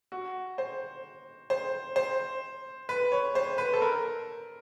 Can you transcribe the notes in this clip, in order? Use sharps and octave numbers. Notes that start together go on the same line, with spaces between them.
F#4
C5
C5
C5
B4
C#5
C5
B4
A4
A#4